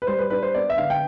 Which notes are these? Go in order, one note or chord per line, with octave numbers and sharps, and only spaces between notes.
B4
G3 C5
B4
D4 B4
C5
B3 D5
E5
D3 F5
G5